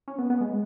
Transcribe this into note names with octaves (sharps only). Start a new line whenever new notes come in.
C#4
B3
B3
G#3